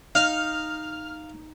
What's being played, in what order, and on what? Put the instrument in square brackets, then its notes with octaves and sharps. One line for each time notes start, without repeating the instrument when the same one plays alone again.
[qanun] D#4 [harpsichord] F5 [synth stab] F6